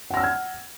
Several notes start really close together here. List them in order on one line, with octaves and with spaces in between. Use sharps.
F#5 A#6 E6 F6 G#6